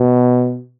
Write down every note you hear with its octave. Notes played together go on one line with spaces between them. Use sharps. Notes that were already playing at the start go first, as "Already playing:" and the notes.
Already playing: B2